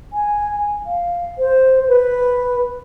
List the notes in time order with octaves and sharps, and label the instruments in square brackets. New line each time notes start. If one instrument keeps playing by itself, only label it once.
[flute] G#5
F5
C5
B4